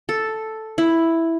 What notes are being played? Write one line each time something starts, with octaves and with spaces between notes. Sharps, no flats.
A4
E4